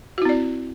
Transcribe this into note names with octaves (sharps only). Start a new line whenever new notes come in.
C4 E4 F#4 D5